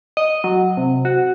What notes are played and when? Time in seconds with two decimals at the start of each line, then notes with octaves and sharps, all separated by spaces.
0.17 D#5
0.44 F#3
0.77 C3
1.05 F#4